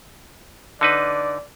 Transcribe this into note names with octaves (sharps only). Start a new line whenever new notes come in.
D3 D#4 B4 D5